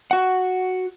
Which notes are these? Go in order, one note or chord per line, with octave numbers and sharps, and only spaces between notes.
F#4 F#5